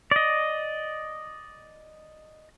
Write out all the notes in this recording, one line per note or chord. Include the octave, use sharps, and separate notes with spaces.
D5 D#5